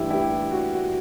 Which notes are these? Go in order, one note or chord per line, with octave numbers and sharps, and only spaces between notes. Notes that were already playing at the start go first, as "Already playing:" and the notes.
Already playing: G2 E3 A3 E4 G4
E4 G4
F#4
F#4